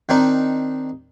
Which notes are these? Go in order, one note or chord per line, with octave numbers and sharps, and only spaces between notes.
D#3 C4 D4 D#4